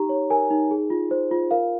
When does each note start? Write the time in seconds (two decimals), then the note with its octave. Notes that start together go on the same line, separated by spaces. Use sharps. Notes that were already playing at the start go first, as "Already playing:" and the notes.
Already playing: D#4 G4 A#5
0.09 C#5
0.30 A#4 G#5
0.50 D#4
0.71 G#4
0.90 F4
1.11 C5
1.31 F4
1.51 A#4 F5